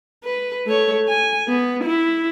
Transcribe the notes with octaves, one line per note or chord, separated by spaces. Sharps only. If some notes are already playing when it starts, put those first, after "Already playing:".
B4
A3 C#5
G#5
B3
E4